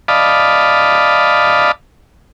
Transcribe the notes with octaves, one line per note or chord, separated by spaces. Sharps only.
D5 D#5 F5 A5 B5